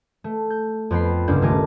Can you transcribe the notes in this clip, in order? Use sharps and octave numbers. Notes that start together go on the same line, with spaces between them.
A3
G6
F2 B3 G5 B5 C7
G1 C#2 A#3 D4 G6
D#1 A3 A#4 G#5 D6